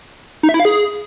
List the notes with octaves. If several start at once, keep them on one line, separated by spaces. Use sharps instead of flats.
D#4
E5
E4
F5
G#4